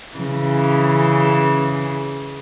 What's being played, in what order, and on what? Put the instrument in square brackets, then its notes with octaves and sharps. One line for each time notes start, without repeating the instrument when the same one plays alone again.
[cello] C#3 E3